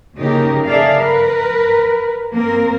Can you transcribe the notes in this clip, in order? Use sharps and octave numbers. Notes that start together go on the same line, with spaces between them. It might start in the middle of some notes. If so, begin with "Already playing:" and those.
C#3 A#3 D#4 G4 A#4
G#4 A4 D5 E5 F5
A#4 B4
A#3 C4 A#4